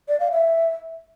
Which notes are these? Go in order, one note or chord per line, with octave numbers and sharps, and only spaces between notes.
D5
F5
E5